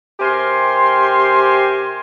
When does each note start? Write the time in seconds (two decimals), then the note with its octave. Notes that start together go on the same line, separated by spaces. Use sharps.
0.20 C3 G4 A#4 G#5 C6